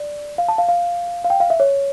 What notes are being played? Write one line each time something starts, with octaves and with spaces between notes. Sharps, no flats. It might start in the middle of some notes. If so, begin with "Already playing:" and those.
Already playing: D5
F5
A5
F5
F5
F5
G5
F5
E5
C#5